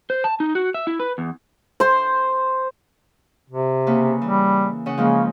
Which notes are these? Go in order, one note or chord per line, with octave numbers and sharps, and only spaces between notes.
C5
A5
D#4
F#4
E5
E4
B4
E2
C5 C6
C3
C#3 A#3 B4
E3 G3
C#3 C#4 F#5
C#3 F3 G#3 A#3